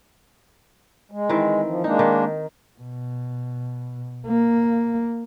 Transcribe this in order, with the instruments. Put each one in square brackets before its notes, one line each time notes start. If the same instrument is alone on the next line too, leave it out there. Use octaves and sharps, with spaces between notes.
[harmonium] G#3
[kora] D#3 E3 C4
[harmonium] F3
[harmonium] G#3 A#3 D4 [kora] D#4
[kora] D#3
[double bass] B2
A#3